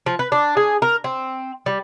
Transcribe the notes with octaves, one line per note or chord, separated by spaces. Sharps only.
F3
B4
D4
G#4
A#4
C4
G3